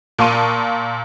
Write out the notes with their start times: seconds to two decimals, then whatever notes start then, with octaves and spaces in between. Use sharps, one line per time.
0.19 A#2 F5 A5 C6 C#6 D#7